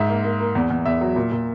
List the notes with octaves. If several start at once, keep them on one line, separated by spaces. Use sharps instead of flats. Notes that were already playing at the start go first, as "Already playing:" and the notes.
Already playing: G#2 E5
A#3
A#3
A#3
E2
E2
E2 E5
F#3
A#2
A#2